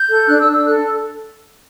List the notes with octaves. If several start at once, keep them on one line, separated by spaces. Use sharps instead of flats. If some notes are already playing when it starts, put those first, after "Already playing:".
Already playing: G6
A4
D4 F#6
E6
D4
E6
A4 F#6